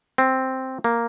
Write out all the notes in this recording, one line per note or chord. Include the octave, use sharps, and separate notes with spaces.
C4
A#3